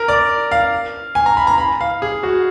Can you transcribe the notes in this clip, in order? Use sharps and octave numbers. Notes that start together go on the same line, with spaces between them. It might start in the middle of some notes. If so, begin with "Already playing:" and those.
Already playing: A#4
D5
F5
G#5
A#5
B5
A#5
B5
F5
G#4
F#4